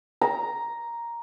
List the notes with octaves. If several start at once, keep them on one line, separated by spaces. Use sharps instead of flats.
A#5